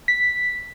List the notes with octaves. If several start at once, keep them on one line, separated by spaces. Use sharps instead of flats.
B6